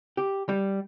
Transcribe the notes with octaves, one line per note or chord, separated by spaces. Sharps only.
G4
G3